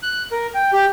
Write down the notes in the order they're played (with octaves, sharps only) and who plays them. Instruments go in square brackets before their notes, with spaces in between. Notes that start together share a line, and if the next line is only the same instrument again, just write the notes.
[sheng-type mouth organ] F#6
A#4
G5
G4